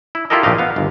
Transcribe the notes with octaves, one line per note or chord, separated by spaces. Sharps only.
E4
E4 F4 G4 A4 A#4 D#5
A#1 A3 G4 D#5 F5
B3 F5
G1 D#2